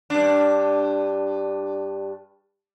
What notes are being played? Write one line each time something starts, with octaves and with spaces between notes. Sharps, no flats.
G2 D4